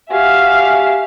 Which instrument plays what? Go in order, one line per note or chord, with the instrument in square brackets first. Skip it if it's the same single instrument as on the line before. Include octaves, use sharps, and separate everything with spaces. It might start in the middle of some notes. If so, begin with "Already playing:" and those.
[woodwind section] F#4 G4 G#5 [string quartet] E5 F5